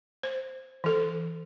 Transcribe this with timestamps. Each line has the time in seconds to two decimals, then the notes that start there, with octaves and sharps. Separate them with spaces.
0.23 C5
0.84 E3 A4